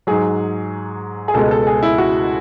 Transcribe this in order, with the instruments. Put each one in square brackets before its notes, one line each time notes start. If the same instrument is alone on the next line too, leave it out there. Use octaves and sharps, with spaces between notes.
[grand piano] G#2 F#3 G#4
G#4
C#2 B2 G#3 A4
A4
G#4
E4
F#4